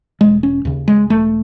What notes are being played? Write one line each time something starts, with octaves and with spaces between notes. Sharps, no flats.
E1 G#3
C#4
D#2 C#3
G#3
E1 A3